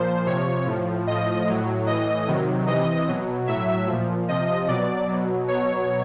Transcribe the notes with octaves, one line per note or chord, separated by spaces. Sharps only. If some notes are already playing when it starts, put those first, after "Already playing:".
Already playing: A#2 F3 C5
C3 F3 C#5
A2 F3
A2 F3 D#5
A2 F#3
A2 E3 D#5
C3 D#3 F#3
C3 E3 D#5
B2 F#3
A2 F#3 E5
A#2 F3
C3 F3 D#5
B2 F#3 D5
B2 F#3
B2 F#3 C#5